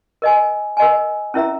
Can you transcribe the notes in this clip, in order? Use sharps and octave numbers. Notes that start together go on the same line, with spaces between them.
A#4 D#5 G#5
A#4 D#5 G#5
C#4 E4 A#4 E5 A#5